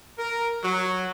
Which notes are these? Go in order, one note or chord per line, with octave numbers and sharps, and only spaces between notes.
A#4
F#3